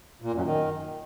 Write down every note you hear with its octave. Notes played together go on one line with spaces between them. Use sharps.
A#2
F#2
D#3